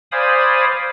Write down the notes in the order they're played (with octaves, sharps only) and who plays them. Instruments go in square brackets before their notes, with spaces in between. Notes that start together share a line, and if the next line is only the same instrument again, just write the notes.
[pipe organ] C5 D5 F5 G#5 B5 D#6